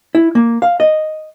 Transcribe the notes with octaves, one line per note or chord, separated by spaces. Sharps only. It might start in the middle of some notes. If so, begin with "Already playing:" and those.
E4
A#3
F5
D#5